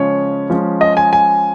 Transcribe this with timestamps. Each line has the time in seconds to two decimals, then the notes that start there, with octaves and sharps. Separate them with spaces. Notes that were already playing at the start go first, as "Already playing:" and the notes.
Already playing: C#3 F3 G#3 C#4 C#5
0.50 F3 G#3 C#4
0.81 D#5
0.97 G#5
1.13 G#5